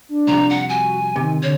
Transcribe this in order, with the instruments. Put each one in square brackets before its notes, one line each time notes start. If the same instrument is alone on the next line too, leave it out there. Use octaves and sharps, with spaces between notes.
[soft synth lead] D4
[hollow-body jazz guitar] C2 F2 C3 [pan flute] A#5
[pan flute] F#5
[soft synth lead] F#4 [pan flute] G#5
[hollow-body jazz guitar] C3 [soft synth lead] D#3
[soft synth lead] D3 [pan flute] C#5